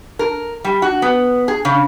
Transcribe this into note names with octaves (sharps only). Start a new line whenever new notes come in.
A#4
G3
F#4
B3
G#4
C#3